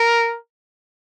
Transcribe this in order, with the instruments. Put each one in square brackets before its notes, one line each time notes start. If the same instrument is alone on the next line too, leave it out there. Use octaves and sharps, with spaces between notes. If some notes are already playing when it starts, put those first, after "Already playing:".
Already playing: [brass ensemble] A#4